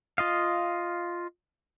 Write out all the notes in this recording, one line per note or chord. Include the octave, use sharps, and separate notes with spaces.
F4 D#5 F5